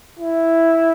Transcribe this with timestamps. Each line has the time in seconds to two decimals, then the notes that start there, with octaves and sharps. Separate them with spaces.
0.19 E4